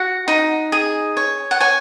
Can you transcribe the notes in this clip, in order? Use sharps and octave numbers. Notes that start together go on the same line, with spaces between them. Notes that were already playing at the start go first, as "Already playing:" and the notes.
Already playing: F#4 F#5
D#4
G#4
C#5
F#5
C#5 G#5